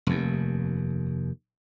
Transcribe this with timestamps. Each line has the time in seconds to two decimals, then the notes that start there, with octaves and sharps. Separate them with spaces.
0.07 F1 D#2